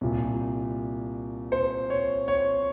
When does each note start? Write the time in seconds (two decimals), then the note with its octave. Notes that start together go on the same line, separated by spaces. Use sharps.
0.01 C2 A#2
1.52 C5
1.90 C#5
2.28 C#5